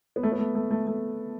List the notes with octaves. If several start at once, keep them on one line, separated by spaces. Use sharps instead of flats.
B3
A3
B3
A3
A3
A3
A3